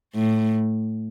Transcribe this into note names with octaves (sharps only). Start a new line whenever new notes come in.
A2